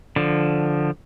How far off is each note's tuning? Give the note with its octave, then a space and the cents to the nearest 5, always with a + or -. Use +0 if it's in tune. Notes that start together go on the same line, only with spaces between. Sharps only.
D3 +0 F3 +0